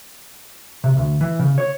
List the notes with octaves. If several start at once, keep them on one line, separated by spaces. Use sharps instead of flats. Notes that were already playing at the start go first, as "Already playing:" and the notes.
C3
D2
E3
C#3
C#5